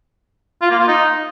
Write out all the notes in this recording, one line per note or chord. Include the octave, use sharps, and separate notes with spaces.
F4
A#3
F4
D#4